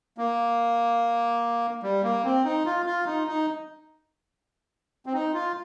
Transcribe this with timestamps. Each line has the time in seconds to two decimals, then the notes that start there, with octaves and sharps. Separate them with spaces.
0.18 A#3
1.83 G3
2.03 A#3
2.24 C4
2.45 D#4
2.65 F4
2.86 F4
3.06 D#4
3.27 D#4
5.06 C4
5.13 D#4
5.34 F4